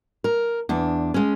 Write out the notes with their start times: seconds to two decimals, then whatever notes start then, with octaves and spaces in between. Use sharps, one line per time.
0.24 A#4
0.69 E2 D4
1.14 G#3 C#4